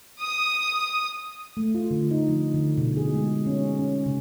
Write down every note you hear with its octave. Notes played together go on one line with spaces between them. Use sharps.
D#6
A3
F4
D3
D#4
F3
D3
B2
G#4
G#3
C#4
C#4
C#3